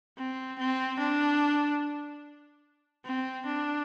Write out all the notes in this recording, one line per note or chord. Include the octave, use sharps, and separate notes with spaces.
C4
C4
D4
C4
D4